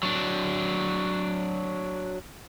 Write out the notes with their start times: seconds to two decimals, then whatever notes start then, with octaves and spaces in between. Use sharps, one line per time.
0.03 F#3 D4